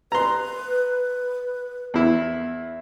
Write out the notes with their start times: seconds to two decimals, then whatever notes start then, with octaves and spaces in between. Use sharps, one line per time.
0.12 B4 A#5 C6
1.94 E2 E4